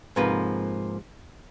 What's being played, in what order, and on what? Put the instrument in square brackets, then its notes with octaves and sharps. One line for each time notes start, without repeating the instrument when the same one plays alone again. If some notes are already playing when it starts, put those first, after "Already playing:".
[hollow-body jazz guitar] G#2 C3 F3 A#3 B4